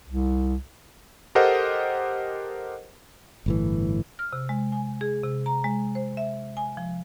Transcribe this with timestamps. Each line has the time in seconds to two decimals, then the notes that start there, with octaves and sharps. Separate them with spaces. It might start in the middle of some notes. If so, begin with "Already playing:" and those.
0.08 C2
1.35 G4 A4 A#4 C5 D#5 F#5
3.46 G1 A2 E3
4.19 F6
4.33 C3
4.49 G#3
4.72 G#5
5.01 G#4
5.23 C3
5.46 A#5
5.64 G#3
5.95 C5
6.17 E5
6.57 G#5
6.77 F3